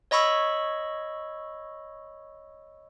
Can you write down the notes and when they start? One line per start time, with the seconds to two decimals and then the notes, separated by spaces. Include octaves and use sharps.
0.11 C#5 D#5 B5 C#6 E6